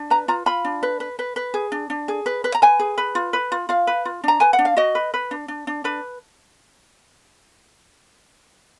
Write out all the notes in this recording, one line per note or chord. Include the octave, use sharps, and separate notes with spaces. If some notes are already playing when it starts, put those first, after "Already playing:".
Already playing: D4
B4 A#5
F4 A#5
F4 B5
D4
B4
B4
B4
B4
G#4
D4
D4
G#4
B4
B4
A#5
B4 G#5
G#4
B4
F4
B4
F4
F4 F5
B4
F4
D4 A#5
B4 G#5
F#5
D4
F5
F#4 D#5
B4
B4
D4
D4
D4
D4 B4